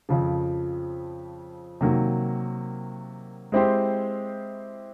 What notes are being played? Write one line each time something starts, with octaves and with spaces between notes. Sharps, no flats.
F2 C#3 F3
C3 D#3 F#3 A#3
G#3 C4 E4 G4 C5